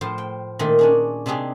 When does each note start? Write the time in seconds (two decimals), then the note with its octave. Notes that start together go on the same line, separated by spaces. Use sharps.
0.01 A2 F3 C5
0.18 G5
0.59 A#2 D#3 A3
0.79 C#4 D4 G#4
1.26 C3 D4 D#4 G4 G#4